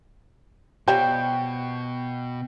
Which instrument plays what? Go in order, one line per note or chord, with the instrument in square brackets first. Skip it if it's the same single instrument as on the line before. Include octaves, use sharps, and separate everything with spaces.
[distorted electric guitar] B2 [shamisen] F3 G3 C#5 [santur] G5